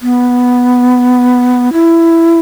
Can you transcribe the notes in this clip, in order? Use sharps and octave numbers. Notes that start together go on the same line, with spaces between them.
B3
E4